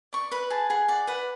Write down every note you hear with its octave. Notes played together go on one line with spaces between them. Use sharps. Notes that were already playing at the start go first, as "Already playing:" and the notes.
D5 C#6
B4 B5
G#4 A5
G#4 F#5
D5 F#5
B4 F#5